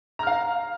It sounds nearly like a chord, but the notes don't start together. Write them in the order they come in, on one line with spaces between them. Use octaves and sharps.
A#5 F6 F5